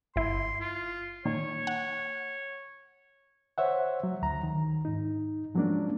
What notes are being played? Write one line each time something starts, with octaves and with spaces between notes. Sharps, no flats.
G1 E4 C6
F4
A#2 D#3 C#5
F#5
C5 C#5 E5 F#5
F#3
D2 A#5
D#3
G#2 D#4
F3 F#3 G#3 A#3 C#4 D4